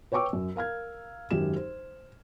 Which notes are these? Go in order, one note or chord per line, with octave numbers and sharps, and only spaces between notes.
B4 C#5 G5 C#6 D6 E6
F#2
A#4 F5 F6 G#6
G#1 F#2 G4 E7
C5